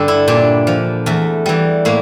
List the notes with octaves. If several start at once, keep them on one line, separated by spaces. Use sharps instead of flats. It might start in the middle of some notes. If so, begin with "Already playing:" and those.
Already playing: G2 D3 G3 A4
E4
A#2 D4
F3
E2 A3
E3 G3
A2 A#3